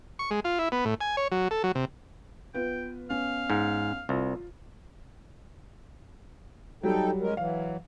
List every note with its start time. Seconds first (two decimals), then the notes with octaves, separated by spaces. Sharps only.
0.19 C#6
0.31 G#3
0.45 F4
0.59 E4
0.72 B3
0.85 A2
1.01 G#5
1.17 C#5
1.32 F#3
1.51 A4
1.64 F#3
1.75 C3
2.54 B3 F4 B4 G5
3.10 B3 C#4 F5
3.50 G#2
4.09 C2 F4
6.83 F#3 G3 D#4 A4 G5
7.21 G#3 C#4 A#4
7.37 E3 F#3 F5